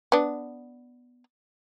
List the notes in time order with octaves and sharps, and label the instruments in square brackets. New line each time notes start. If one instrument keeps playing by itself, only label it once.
[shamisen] B3 D4